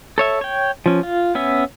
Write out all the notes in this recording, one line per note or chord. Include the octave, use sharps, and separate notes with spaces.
A4 C#5 E5
C#5 G5
F3 C#4
F4
B3 C#4 E5